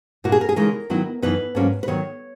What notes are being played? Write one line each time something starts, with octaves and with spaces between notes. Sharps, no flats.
A#2 A#3 E4 F#4
G#4
A#4
G#4
C#3 E3 G#3 D#4 A#4
D#3 F#3 B3 E4
F#2 E3 B3 D#4 B4
G#2 F#3 A#3 C#4
B4
D#3 F#3 B3 C#5